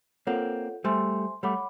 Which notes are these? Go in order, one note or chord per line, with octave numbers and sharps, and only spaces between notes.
A#3 C4 F4 A4 C#5 F#5
G3 A3 C5 E5 G#5 C6
G3 A3 C#5 F#5 B5 D6